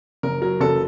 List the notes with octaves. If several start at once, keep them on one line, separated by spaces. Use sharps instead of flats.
F#1 A#4
F#3 A#4
F#1 A4